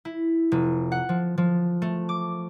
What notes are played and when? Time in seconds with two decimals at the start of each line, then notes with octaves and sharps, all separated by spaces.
0.05 E4
0.52 F1
0.92 F#5
1.09 F3
1.38 F3
1.82 A3
2.09 D6